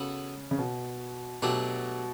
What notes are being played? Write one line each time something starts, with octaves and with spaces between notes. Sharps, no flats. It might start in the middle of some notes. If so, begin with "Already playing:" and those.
Already playing: C#3 B3 F#4 A4
C#3
B2
B2 F#3 A3 D4 G4